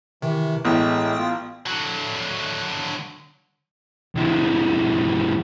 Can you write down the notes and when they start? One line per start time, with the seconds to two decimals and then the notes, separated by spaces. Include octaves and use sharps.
0.22 C3 D#3 E3
0.65 A1 A2 G#3 B3 G5 D#6
1.18 F4
1.66 D3 F#3
4.15 C#2 E3